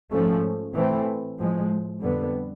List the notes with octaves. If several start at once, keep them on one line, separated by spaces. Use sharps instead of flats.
G#2 F3 A3 C#4
A2 E3 A3 C4
A2 F3 G#3
F2 D3 G3 B3